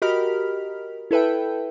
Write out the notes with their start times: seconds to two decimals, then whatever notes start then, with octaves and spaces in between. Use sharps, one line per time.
0.02 F#4 G4 A#4 D#5 B5 F6
1.11 E4 A4 B4 E5 G5